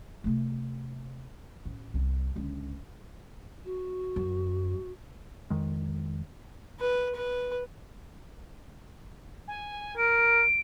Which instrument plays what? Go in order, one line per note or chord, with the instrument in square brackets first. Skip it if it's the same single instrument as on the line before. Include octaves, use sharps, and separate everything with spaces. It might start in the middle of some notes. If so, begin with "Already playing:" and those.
[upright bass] C3 A3
A1
C2
C#2 D3
[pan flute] F#4
[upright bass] F#2
[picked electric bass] F2 D#3 G#3
[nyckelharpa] B4
B4
[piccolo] G#5
[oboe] A#4 [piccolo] D7